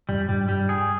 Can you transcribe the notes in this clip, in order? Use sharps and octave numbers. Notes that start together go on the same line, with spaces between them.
F2 G3
G2 G3
G3
G#4